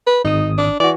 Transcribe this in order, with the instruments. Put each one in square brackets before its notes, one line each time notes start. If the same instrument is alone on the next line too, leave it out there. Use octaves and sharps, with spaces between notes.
[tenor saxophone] B4
[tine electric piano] G#1 D#6 [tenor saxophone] D#4
[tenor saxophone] D4
[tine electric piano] E3 F#4 [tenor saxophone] D5